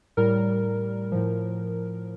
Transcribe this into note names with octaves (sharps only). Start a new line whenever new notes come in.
A2 G3 A#4
A2 F3